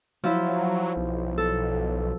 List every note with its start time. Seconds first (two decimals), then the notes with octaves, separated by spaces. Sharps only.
0.24 F3 F#3 E4
0.96 B1
1.38 A4